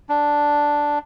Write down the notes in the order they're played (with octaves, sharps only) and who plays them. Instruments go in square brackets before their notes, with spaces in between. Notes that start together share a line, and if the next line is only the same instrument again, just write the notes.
[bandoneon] D4